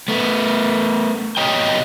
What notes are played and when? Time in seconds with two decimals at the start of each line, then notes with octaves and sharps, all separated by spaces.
0.08 A3 B3
1.37 B2 C#5 D#5 G5